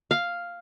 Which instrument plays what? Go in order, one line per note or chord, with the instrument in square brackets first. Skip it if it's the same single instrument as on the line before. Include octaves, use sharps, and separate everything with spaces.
[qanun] F5